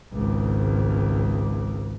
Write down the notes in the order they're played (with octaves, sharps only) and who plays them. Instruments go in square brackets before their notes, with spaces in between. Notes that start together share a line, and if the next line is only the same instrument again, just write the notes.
[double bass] G#1 C#2